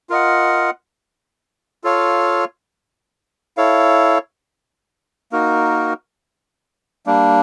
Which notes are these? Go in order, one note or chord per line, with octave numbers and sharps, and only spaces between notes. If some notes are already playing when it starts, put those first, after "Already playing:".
F4 A#4 D#5 F#5
F4 A4 C#5 F5
E4 A4 C#5 F5
A#3 D#4 F#4 A#4
G3 A#3 D4